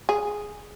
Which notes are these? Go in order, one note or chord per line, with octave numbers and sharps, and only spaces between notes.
G#4